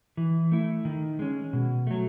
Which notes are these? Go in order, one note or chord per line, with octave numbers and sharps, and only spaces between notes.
E3
A3 E4
D#3
G#3 C#4
B2
F#3 A3